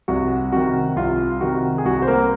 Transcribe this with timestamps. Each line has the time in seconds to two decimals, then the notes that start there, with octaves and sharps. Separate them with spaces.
0.08 C2 F#4
0.52 C3 D#3 F#4
0.96 C2 F4
1.41 C3 D#3 F#4
1.78 G#4
1.85 C2 F#4
2.02 C5
2.07 A#3 A#4